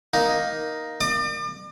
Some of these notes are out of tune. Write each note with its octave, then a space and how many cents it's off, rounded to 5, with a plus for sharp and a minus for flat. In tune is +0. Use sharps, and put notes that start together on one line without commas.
A#3 +10 D#4 +5
D5 +35 D6 +45